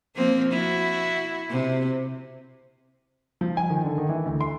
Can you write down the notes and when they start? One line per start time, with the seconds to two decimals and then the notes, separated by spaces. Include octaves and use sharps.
0.16 F3 A#3 C4
0.53 E4 F#4
1.49 C3
3.41 F3
3.57 G#5
3.70 D#3
3.84 D3
3.98 D#3
4.09 E3
4.26 D2
4.41 C6